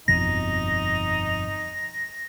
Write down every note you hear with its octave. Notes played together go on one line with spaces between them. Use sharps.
G1 F2 B2 D#4 A#6